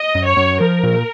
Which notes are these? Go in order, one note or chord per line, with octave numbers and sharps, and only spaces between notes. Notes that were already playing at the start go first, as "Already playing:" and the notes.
Already playing: D#5
F#2
C#5
F#2
F3 A#4
A#2